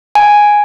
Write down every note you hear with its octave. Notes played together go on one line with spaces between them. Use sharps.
G#5